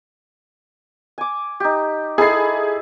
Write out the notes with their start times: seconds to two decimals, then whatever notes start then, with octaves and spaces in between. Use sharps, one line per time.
1.18 G#5 D6
1.60 D#4 G4
2.18 D#4 E4 G#4 A4 C7